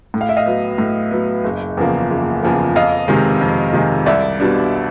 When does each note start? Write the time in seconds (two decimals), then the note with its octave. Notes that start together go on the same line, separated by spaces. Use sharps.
0.14 A2
0.21 F5
0.29 E5
0.37 D#5 F5
0.46 F#3 B3
0.78 A2
1.11 F#3 B3
1.44 F#1
1.77 E2 C#3 F3 A#3
2.10 F#1
2.42 E2 C#3 F3 A#3
2.75 F2 D#5 F5
3.08 C3 D#3 G#3
3.41 F2
3.74 C3 D#3 G#3
4.06 C2 D5 E5
4.40 B2 G3 B3 D4